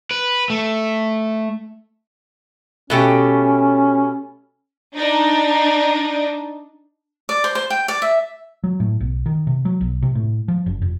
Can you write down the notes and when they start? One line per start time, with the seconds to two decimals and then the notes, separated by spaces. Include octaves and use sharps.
0.11 B4
0.50 A3
2.90 B2 A3 C#4 G4
4.96 D4 D#4
7.29 D5
7.44 C5
7.55 C5
7.70 G5
7.88 D5
8.02 E5
8.64 F#3
8.80 A2
9.00 B1
9.26 D#3
9.47 C3
9.65 F#3
9.81 B1
10.02 C3
10.15 A2
10.48 F3
10.66 F#1
10.82 F1